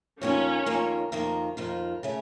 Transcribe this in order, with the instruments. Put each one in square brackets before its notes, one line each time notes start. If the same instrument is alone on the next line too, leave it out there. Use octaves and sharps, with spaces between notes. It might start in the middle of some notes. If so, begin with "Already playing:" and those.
[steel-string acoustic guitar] F2 D#3 A#3 F4 [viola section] C#4
[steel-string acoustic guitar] F2 D#3 A#3 F4
F2 D#3 A#3 F4
F2 D#3 A#3 F4
C#3 A3 C#4